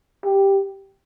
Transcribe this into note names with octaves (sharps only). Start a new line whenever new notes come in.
G4